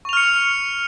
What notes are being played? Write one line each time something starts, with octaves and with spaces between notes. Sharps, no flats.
C#6 F6 C#7 F7